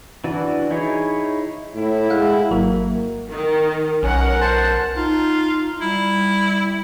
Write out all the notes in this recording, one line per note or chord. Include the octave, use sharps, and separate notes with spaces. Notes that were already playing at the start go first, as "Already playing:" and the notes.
E3 D4 F#4
D#4 E4 G#4 C#5
A2 E4
G#3 F5 F#5
G#1 F#3 A#3 A#4
D#3
B1 C#4 A#4 F#5
C5 A5
D#4 F4
G3 E4